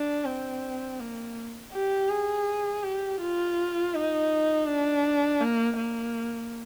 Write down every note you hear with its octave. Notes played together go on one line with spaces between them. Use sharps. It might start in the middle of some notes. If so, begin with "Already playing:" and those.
Already playing: D4
C4
A#3
G4
G#4
G4
F4
D#4
D4
A#3
A#3